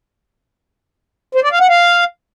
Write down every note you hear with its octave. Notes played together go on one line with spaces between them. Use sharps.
C5
D5
F5
F#5
F5